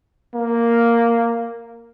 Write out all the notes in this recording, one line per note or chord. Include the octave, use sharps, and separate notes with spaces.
A#3